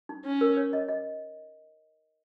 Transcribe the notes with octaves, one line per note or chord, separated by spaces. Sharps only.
D#4
C#4
A#4
C#5
D#5
D#5